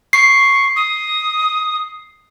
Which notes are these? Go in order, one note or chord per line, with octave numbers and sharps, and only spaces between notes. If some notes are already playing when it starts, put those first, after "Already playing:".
C#6 C7
D#6